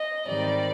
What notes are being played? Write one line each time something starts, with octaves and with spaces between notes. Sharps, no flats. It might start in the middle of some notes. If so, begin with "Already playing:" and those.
Already playing: D#5
G#2 D#3 G3 C4 D5